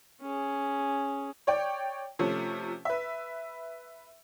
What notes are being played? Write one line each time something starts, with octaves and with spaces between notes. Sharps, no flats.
C#4 G#4
C#5 D5 G5
C3 F3 A3 C#4
B4 E5